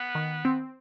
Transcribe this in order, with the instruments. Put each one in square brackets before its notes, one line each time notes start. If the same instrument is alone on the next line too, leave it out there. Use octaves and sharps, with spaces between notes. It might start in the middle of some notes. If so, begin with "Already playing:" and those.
Already playing: [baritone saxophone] B3
[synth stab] D#3
C4